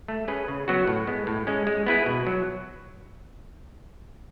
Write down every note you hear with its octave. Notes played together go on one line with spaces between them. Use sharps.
A3
C#4 G#4 B4
C#3
F#3 B3 F#4
A2
G#3 B3
A2
G#3 C#4
G#3
B3 E4 G#4 B4
B2
F#3